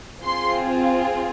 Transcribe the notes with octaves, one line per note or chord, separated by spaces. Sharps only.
C4 F4 G#4 C6